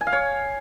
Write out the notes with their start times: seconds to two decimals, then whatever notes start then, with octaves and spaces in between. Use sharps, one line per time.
0.01 G#5
0.07 F5
0.13 C#5